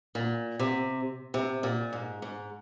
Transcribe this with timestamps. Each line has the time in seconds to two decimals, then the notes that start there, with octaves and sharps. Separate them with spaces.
0.15 A#2
0.59 C3
1.34 C3
1.63 A#2
1.93 G#2
2.22 G#2